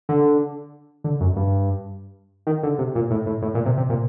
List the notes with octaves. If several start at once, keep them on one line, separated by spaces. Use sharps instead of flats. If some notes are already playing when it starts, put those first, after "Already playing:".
D3
D3
F#2
G2
D#3
D3
C3
A#2
A2
A2
A2
A#2
C3
C3
A#2